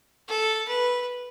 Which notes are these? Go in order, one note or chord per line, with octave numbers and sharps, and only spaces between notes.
A4
B4